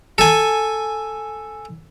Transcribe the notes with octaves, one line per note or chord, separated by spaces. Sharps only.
A4 G#5